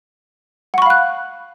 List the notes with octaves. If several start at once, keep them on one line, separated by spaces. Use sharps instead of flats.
F5 F#5 B5 C#6 F#6